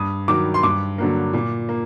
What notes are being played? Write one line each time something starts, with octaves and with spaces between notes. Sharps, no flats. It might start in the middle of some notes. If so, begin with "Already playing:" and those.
Already playing: G2 D#6
D#3 F#3 D6
C6
G2 D6
D3 F#3 A#3
A#2
A#3